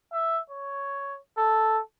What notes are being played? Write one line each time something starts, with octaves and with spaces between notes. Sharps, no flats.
E5
C#5
A4